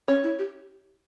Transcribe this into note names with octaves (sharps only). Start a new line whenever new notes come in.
C#4 C#5
E4
G4